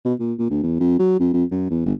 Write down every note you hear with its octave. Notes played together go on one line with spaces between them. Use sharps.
B2
A#2
A#2
D2
E2
F2
F#3
F2
F2
F#2
E2
G1